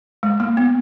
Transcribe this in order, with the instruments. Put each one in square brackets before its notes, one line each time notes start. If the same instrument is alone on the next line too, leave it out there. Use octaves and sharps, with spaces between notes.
[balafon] G#3
A#3
B3